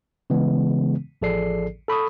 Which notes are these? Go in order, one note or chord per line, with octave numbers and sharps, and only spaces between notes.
C#3 E3 G#3 B3
A1 F3 G#4 A4 D5 C7
A4 B5 C#6 D#6